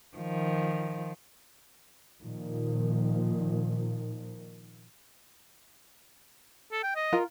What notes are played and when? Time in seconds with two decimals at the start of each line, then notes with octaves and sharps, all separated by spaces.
0.17 D#3 F3
2.22 A#2 D#3 F3
6.72 A4
6.83 G5
6.95 D#5
7.13 F4 A#4